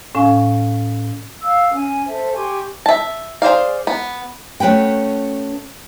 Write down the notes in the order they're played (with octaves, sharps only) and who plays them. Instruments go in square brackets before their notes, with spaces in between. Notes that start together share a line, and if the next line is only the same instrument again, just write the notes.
[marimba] A2 C#4 F5 G#5
[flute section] F5 E6
C#4 G#5
A4 C5 E5
G4 G#5 C6 C#6
[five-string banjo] E5 A5
G#4 C5 D5 F5
B3
[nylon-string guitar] A3 C#4 F#4 B4 G5